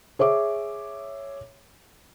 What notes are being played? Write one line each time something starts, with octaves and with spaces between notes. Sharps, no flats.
G#4 C#5 E5 D6